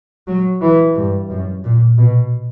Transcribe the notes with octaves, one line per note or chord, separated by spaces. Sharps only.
F#3
E3
G2
F#2
A#2
B2